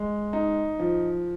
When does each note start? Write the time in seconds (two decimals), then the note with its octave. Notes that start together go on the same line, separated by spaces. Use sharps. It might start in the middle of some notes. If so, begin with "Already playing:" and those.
Already playing: G#3
0.33 D#4
0.79 F3